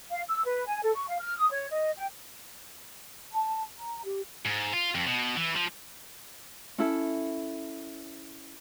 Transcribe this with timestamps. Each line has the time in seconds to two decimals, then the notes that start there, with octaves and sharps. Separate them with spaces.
0.11 F5
0.28 E6
0.45 B4
0.67 G#5
0.83 A4
0.95 C#6
1.08 F5
1.20 F6
1.37 D#6
1.50 C#5
1.71 D#5
1.97 G5
3.33 A5
3.78 A#5
4.05 G4
4.45 G#2
4.73 F4
4.95 F2
5.07 B2
5.36 E3
5.55 F3
6.78 C#4 E4 A4